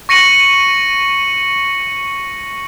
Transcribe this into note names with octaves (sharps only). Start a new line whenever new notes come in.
C#6 A#6 C#7 D#7 F#7